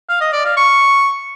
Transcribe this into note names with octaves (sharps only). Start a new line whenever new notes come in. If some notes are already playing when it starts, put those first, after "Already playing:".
F5
D#5
D5
F5
C#6